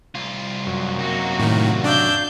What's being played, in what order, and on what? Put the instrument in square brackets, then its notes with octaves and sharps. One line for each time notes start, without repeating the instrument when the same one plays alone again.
[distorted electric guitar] C2 F4
[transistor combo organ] F#2
[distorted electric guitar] C3 D#4 [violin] A#3 F#4
[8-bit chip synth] A2 D#3
[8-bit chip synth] D4 D6 E6 [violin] F5 G6